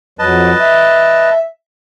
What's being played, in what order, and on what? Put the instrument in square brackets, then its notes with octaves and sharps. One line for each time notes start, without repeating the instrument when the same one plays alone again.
[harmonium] F2 F#3 [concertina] B4 D#5 A5
[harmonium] E5